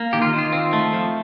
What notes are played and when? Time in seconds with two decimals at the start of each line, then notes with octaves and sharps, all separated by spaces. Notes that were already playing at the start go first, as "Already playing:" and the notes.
Already playing: A#3
0.13 D#3 G4
0.22 F4
0.33 D#3
0.38 F4
0.52 C4
0.73 A3
0.93 F3